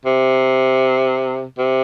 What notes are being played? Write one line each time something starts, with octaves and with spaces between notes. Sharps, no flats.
C3
C3